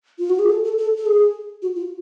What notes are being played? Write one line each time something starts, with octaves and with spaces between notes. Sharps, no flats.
F4
F#4
G#4
A4
A4
A4
A4
G#4
F#4
F4